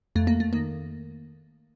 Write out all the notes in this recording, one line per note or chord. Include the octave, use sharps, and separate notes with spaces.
F2 A3
A#3
A3
D#3 A#3